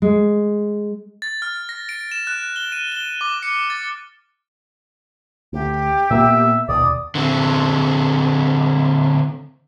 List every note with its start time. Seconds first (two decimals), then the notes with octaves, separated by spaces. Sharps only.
0.02 G#3
1.22 A6
1.42 F6
1.69 A#6
1.89 D7
2.12 E7
2.27 F#6
2.56 G7
2.72 D#7
2.92 G7
3.21 D6
3.43 C#7
3.70 A6
5.53 D2 G4
6.11 A#2 A#3 B3 E5
6.69 D#2 B2 D5 D#6
7.15 D3 C4